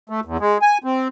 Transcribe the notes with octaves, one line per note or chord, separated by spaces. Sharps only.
A3
E2
G#3
G#5
C4